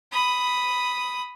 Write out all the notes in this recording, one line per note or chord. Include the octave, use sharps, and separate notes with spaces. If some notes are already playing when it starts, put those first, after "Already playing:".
B5 D#6